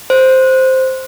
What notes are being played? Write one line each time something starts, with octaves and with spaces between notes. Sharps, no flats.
C5